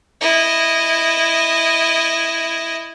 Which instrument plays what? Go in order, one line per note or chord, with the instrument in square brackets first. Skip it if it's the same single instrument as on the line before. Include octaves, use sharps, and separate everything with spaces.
[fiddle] E4 D#5